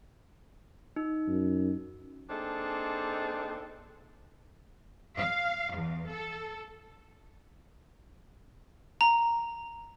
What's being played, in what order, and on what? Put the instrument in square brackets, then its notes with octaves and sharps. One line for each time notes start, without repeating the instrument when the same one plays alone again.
[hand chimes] D#4
[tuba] F#2
[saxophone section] A#3 C4 D4 D#4 G#4 A4
[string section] F5
E2
A4
[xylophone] A#5